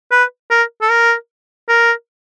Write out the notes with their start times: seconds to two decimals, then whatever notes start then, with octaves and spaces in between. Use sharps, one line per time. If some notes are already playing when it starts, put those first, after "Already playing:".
0.12 B4
0.51 A#4
0.82 A4
0.90 A#4
1.68 A#4